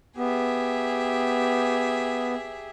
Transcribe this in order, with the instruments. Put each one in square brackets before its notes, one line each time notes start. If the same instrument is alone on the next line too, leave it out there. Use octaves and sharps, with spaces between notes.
[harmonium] B3 [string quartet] G4 G#4 E5